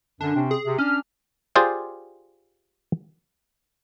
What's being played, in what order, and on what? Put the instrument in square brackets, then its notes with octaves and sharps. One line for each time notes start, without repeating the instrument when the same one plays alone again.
[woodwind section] F#2 D3 [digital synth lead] D4
[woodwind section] C3 C4 C#4
[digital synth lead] G#4
[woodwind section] C3
[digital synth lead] C#4 [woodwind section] D4 F6
[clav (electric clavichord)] F4 G4 G#4 C5 D5 F5